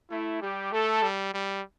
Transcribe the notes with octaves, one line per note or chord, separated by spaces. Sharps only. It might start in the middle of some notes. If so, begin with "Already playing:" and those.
A3 E4
G3 G4
A3 A4
G3
G3